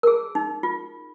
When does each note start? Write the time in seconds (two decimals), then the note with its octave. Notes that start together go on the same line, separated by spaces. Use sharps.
0.03 A#4
0.07 G#4
0.35 D#4
0.63 F4